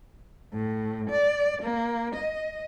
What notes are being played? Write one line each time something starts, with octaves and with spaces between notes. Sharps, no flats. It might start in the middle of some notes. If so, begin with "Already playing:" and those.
A2
D5
A#3
D#5